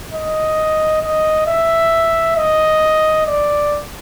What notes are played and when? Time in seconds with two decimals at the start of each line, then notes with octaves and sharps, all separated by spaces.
0.12 D#5
1.02 D#5
1.47 E5
2.37 D#5
3.27 D5